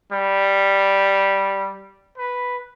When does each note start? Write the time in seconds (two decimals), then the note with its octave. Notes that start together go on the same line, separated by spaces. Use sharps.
0.12 G3
2.18 B4